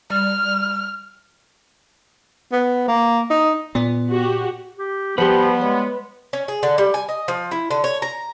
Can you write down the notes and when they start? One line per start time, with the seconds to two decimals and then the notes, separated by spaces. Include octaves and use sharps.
0.10 G3 F6
2.52 B3
2.88 A#3
3.30 D#4
3.75 A#2 B3
4.12 F#4 G4
4.79 G4
5.18 F3 G3 B3 G4 B4 F#5 B5 C6
5.61 G#3 C#5
6.33 C#4
6.48 G#4
6.63 D3
6.78 G3
6.94 G#5
7.09 D#5
7.28 F3
7.51 E4
7.71 D3
7.84 C#5
8.02 A#5